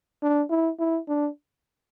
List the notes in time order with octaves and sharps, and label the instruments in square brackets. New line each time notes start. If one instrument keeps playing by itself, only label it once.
[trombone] D4
E4
E4
D4